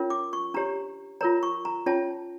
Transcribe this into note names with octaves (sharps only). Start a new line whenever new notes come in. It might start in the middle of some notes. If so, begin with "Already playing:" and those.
Already playing: C#4 F4 A#4 C#5
D6
C#6
D4 G4 C#5 A#5
F4 A#4 C#5 A#5
C#6
A#5
C#4 F4 C#5 A5